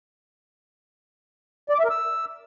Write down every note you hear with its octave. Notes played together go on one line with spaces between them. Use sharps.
D5
D6
E5
A#4
E6